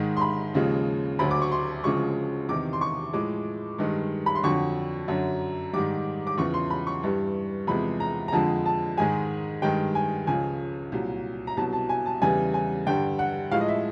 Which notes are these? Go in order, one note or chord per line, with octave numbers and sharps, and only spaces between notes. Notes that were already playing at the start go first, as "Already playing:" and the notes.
Already playing: G#2 D#3 G#3
C6
B5
D#2 C#3 F3 G#3
D2 D3 F#3 B5
D6
C#6
C6
D2 C#3 F3 G#3 C#6
E2 C3 D#3 D6
C6
C#6
A2 F3 G#3 D6
G2 D#3 G#3
B5
C6
F2 D3 F#3 C#6
F#2 D3 F#3
G#2 D#3 G3 D6
D6
E2 C#3 F3 C#6
C6
B5
C#6
G2 E3 G3
E2 C3 F3 G#3 B5
A#5
A#5
F2 D3 F3 G#3 A5
A5
G#2 D#3 G#3 G#5
G2 D#3 G#3 G5
G#5
C#2 C#3 F3 G#5
C2 A#2 F#3
A#5
C2 B2 F#3 A5
A5
G#5
A5
E2 C#3 E3 G3 G#5
G#5
G2 D3 G3 G5
F#5
A2 F3 G#3 F5
D#5
E5